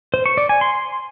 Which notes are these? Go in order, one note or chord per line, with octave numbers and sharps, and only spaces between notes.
C5
C#6
D5
G#5
C6